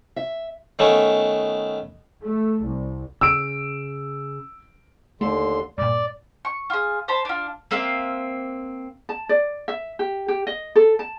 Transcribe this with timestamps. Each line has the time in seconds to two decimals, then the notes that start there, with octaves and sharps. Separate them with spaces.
0.16 E5
0.79 D#3 A3 B3 C#4
2.22 A3
2.63 C2
3.21 C#3 E6 D7
5.21 D#2 D3 A3 C6
5.78 G2 A#2 D5
6.45 C#6
6.70 F4 G#4
7.08 C5 A5 B5
7.25 D4 F4
7.71 A#3 C4 E5 F5
9.09 A5
9.29 D5
9.68 E5
9.99 G4
10.28 G4
10.47 D#5
10.76 A4
10.99 A5